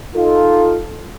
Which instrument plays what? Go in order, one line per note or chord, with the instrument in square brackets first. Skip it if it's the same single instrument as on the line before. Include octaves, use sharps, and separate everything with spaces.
[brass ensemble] D#4 F4 A4